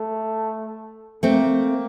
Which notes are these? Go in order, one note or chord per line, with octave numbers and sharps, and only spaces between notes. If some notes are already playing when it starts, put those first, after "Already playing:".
Already playing: A3
A3 A#3 C4